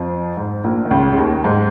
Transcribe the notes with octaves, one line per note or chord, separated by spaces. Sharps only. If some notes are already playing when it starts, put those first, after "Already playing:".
Already playing: F2 F3
G#2
A#1 A#2
D#3
C#2 C#3
C#3
D#2 D#3
G#2 G#3